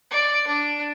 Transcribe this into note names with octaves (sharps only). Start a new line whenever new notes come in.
D5
D4